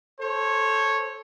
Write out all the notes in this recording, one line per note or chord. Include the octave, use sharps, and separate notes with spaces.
A4 C5 C#5